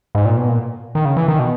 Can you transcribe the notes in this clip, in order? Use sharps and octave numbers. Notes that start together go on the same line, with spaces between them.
G#2
A#2
B2
A#2
D#3
C#3
E3
D#3
B2